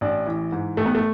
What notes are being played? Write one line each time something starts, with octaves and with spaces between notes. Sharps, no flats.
A1 D4
E3
G#2
A1 A3
B3
A3